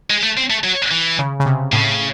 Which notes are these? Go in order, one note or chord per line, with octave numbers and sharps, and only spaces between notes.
G#3
A3
C4
A3
F#3
E3
C#3
C#3
C3
A2 C#3